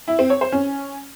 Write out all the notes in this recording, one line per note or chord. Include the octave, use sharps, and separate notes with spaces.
E4
C4
C#5
C5
C#4